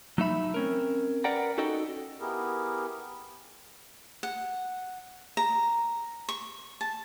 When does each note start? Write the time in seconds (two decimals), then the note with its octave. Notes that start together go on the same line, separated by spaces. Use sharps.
0.18 F#3 A3 D#4 E5 B5
0.54 C4 C#4 A#4
1.24 A#4 B4 D5 F#5 G5 A#5
1.58 C#4 D#4 F#4 A4 D#5 G5
2.20 B3 E4 G4 G#4 A#4
4.23 F#5
5.37 A#5
6.29 C#6
6.81 A5